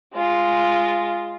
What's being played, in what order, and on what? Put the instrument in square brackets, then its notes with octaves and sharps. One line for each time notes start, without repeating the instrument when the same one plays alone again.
[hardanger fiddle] G#3 F4